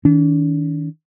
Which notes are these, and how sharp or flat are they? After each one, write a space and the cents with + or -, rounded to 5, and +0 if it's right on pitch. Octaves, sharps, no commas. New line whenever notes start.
D#3 +30 D4 -45